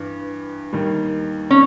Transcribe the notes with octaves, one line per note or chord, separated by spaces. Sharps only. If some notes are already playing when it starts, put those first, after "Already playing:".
Already playing: G2 E3
D#2 D#3 G3
C#4